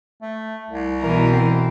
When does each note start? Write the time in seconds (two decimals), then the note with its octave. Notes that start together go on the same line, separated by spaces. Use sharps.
0.22 A3
0.69 C2
1.00 B2 E3 A#4
1.32 C4